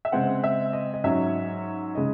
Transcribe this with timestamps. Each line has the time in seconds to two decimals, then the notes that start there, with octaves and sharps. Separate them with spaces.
0.05 E5
0.12 C#3 G#3 C4 F#5
0.44 E5
0.73 D#5
0.94 D#5
1.04 G#2 F#3 C#4 E5
1.95 C#3 G#3 D#5